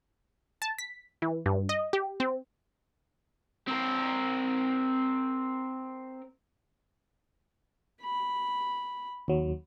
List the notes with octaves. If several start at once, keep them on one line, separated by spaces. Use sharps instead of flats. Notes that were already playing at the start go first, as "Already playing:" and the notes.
A5
B6
E3
G2
D#5
G4
C4
C4 A#4
B5
D#2 F#3